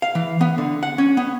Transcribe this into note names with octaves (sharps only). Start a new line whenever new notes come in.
F5
E3
B3
D3
F#5
C#4
B3